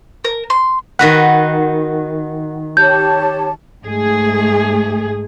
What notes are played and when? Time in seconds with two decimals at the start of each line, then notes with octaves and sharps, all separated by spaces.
0.25 A#4
0.50 C6
0.99 D#3 F#4 B4 F#5
2.77 G4 C#5 A5 G6
3.84 G#2 A3 G#4